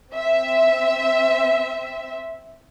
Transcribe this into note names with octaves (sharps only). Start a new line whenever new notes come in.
C4 E5